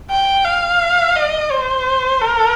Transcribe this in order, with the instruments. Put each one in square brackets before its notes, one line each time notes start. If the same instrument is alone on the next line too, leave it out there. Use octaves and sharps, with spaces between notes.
[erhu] G5
F5
D#5
C5
A#4